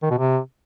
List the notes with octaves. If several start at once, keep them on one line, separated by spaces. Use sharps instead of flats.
D#3
B2
C3